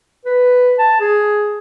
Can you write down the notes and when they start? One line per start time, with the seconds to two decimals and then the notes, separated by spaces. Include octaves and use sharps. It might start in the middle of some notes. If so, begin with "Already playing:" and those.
0.25 B4
0.78 A5
1.00 G#4